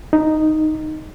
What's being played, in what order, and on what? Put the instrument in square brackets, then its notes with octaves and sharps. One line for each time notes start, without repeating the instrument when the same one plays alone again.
[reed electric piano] D#4